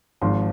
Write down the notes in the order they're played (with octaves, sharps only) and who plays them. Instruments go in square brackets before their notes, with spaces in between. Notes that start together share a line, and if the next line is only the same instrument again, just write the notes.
[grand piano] G#1 G#2 F3 C6